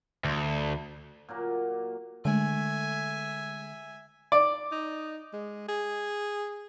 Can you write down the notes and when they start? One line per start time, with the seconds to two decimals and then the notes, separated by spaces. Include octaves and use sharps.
0.24 D2
1.29 A#2 F#3 A#3
2.25 D3 G#3 A3 E5 G#5
4.32 D5
4.72 D#4
5.33 G#3
5.69 G#4